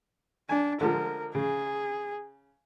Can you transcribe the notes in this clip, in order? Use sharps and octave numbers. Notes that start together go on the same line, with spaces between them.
D4 G#5
D3 F3 G#3 A#4
C#3 G#4